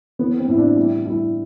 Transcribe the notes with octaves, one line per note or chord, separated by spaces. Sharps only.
E3 B3
C4
A2 E4
D4
G3 E4
G3 E4